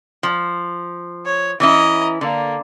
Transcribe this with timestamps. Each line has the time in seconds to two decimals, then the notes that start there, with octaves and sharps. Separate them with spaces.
0.23 F3
1.25 C#5
1.60 E3 C#4 E4 D#5 A#5
2.21 D3 A#3